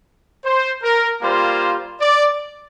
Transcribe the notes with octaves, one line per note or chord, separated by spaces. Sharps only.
C5
A#4
G3 A#3 F4 C5
D5